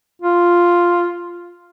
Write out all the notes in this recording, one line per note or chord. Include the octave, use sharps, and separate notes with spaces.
F4